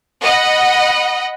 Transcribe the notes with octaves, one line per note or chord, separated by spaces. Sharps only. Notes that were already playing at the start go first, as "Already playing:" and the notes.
D#5 F#5 B5